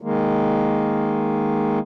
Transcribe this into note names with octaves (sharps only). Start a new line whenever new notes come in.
D#3 G#3 A#3